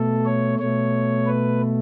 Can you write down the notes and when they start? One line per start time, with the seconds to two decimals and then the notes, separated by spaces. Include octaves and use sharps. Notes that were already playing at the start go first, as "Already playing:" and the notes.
Already playing: B2 A3 A4
0.25 C#5
0.59 B2 A3 C#5
1.26 B4